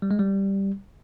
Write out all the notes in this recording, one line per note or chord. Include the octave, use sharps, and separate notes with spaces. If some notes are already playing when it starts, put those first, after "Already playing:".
G3
G#3
G3